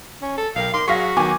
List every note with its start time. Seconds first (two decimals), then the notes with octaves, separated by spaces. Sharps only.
0.22 C#4
0.38 A4
0.56 B1 A#4 F5 G5
0.74 D#4 A#4 C6 D6
0.88 F#3 F#4 G#4 F5 C#6 A#6 B6
1.17 D#3 F#3 B3 G#5 D6